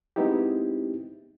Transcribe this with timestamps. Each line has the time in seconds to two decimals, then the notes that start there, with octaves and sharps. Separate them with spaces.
0.16 G#3 B3 C4 D#4 E4 G4